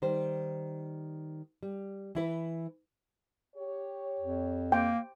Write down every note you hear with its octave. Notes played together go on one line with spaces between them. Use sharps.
D#3 G3 C5
G3
E3 E4 B4
G4 C#5
F2
A#3 G5